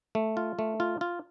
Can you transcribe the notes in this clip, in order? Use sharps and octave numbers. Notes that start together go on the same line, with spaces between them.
A3
F4
A3
F4
F4